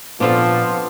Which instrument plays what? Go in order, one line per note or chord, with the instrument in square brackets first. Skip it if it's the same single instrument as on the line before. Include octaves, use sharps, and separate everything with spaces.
[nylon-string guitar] A#2 [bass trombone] F3 [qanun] B3 C4 F5 [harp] D4 F4 A4